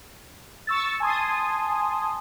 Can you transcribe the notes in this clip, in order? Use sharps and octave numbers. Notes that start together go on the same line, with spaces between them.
C#6 E6 A6
G#5 A5 C6 D#6